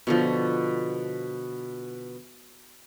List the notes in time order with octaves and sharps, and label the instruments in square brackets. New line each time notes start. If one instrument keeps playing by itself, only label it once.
[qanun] B2 D3 F3